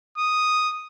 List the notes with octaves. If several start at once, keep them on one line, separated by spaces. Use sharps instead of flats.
D#6